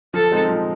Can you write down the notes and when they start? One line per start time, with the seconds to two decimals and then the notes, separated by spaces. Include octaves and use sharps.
0.14 F3 A4
0.32 G#3 C4 D#4
0.49 F3